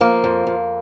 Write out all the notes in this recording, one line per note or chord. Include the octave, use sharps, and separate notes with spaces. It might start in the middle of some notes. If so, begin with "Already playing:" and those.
F3 A#3
F2
F2